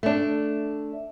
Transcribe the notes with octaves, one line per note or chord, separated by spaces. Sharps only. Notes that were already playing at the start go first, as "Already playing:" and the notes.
A3 D4